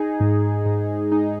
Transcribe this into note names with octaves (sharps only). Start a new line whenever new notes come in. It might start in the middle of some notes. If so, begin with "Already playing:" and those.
Already playing: D#4 G#4
G#2
G#2
D#4